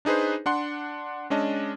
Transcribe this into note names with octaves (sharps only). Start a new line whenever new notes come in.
D4 D#4 G#4 B4 C5
D4 F#5 C6
G#3 C#4 D4 D#5 A5